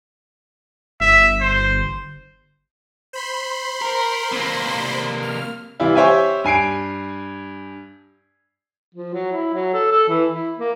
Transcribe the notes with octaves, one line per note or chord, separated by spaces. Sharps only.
G1 E5
C5
C5 B5 C6
A#4
C3 A#3
F6
C3 E3 G3 E4 F4
G4 C5 C#5 E5 G5 G#5
G2 G#5 C7 D7
F3
F#3
E4
F#3
A4
A4
E3
E4
A#3